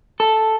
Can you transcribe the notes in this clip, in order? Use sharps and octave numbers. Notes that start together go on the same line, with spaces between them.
A4